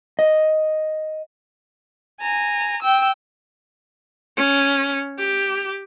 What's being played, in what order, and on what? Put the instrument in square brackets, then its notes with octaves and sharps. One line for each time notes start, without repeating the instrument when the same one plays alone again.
[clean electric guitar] D#5
[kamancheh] G#5 A#5
G5 E6
[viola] C#4
G4